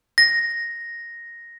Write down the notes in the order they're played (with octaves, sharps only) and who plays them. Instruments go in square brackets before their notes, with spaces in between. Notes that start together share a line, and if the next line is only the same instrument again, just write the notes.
[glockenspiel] A#6